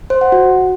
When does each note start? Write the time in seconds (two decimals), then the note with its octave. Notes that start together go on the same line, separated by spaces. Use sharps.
0.10 C5
0.21 F#5
0.32 F#4